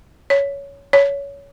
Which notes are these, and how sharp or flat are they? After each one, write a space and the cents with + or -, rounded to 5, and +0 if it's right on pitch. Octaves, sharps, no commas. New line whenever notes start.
C#5 +15
C#5 +20